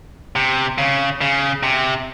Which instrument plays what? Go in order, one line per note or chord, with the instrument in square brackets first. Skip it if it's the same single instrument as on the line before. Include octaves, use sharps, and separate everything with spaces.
[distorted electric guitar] C3
C#3
C#3
C3